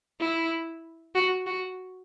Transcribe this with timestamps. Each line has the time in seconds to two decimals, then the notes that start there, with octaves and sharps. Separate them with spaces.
0.20 E4
1.15 F#4
1.47 F#4